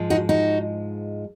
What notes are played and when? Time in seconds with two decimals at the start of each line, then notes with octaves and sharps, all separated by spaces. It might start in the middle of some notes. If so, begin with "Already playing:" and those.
Already playing: G#2 F3 G#3
0.10 D#4 F#4
0.29 D#4 F#4